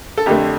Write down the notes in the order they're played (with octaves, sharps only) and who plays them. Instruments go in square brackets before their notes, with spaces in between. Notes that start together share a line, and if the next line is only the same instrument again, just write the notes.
[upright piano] A4
F2 D3 A3 G4